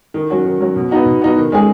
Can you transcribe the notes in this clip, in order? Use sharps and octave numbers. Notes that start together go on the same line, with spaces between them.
D#3
F#3 C#4 F#4
D#3
F#3 C#4 F#4
B2
B3 D#4 F#4
B2
B3 D#4 F#4
D#3
G#3 C#4 G#4